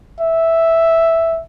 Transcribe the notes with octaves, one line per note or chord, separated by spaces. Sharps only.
E5